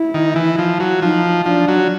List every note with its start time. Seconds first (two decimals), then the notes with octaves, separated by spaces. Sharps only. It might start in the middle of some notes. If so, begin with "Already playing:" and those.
Already playing: E4
0.14 D#3
0.36 E3
0.59 F3
0.80 F#3
1.02 F3 D#4
1.46 F3 D4
1.68 F#3